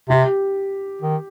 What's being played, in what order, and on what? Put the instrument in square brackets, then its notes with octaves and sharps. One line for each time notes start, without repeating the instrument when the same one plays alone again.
[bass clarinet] C3 [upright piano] G4
[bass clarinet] D#3